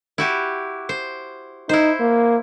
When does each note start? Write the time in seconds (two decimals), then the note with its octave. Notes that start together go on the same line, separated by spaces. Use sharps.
0.18 E4 F#4 G4
0.89 C5
1.69 D#4 E4 C5
2.00 A#3